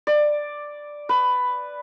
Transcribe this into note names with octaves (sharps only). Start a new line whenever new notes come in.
D5
B4